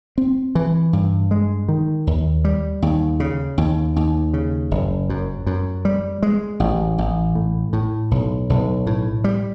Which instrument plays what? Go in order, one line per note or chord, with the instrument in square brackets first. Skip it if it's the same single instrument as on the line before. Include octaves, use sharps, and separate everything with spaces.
[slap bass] C4
E3
G2
G#3
D#3
D#2
G3
D#2
C#3
D#2
D#2
C#3
F#1
F#2
F#2
G3
G#3
A1
A1
A2
A2
B1
B1
A2
G3